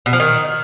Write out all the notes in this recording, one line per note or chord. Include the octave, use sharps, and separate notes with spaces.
B2
F3
D#3